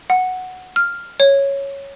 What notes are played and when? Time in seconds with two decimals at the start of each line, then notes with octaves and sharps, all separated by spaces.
0.10 F#5
0.76 F6
1.20 C#5